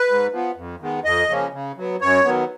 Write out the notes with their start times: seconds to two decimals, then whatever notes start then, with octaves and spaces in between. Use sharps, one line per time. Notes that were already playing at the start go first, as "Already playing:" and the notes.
Already playing: B4
0.08 G#2
0.32 F3 B3
0.56 F2
0.81 D#3 G#3 B3
1.04 F2 D#5
1.29 C#3 F3 A#3 C#4
1.53 C#3
1.77 F#3 B3
2.01 F#2 C#5
2.25 D#3 F#3 B3